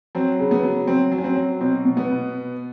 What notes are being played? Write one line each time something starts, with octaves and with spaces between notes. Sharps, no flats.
F#3 C4
C#3
B3
F#3
F#3 C4
F#3
C#4
C4
F#3
B2 C4
B2
B3
B2